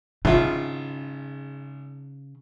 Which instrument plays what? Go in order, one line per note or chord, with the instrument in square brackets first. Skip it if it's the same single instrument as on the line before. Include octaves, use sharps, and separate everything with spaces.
[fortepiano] G#1 E4 F4 [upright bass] C#3